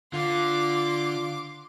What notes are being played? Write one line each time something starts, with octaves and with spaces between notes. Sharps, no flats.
D3 F4 C6 D6